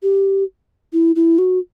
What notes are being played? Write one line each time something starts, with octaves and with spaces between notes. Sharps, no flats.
G4
E4
E4
F#4